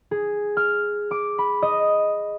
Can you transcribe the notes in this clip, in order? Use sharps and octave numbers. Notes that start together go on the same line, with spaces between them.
G#4
F6
D6
B5
D#5